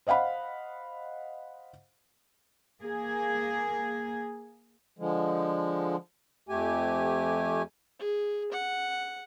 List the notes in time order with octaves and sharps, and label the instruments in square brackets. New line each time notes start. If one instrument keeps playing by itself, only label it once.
[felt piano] C5 D#5 F5 F#5 B5
[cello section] A#3 G#4
[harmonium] D3 F3 G#3
F2 A3 G4 G#5
[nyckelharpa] G#4
F#5